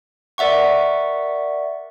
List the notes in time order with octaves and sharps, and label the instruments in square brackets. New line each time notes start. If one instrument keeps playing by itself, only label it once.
[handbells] A#4 D5 E5 F#5 C#6